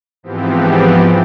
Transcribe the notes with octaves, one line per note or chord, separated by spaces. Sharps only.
G#2 E3 F3 B3 C4 G4